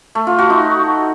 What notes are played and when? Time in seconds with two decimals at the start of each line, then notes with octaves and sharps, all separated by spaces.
0.15 A3
0.27 F4
0.38 F#4
0.50 D#4